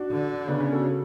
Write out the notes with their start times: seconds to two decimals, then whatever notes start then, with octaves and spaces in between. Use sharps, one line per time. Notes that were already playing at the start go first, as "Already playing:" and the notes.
Already playing: D4 F#4
0.11 D3
0.47 C#3 B3 D4
0.60 C#4
0.72 F#4 A4